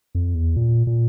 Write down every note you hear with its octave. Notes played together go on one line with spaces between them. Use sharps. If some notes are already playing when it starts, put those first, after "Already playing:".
F2
E2
A#2
A#2